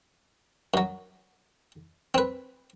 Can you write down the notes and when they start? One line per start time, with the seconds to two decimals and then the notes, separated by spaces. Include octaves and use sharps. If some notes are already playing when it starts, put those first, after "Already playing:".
0.74 F#2 F#3
2.14 C4 B4